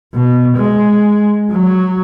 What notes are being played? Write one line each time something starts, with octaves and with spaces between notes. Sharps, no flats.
B2
G#3
F#3